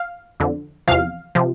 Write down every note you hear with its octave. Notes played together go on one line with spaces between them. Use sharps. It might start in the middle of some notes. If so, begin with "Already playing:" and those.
Already playing: F5
F2 D3 F3
E2 C3 F3 F5
C3 F3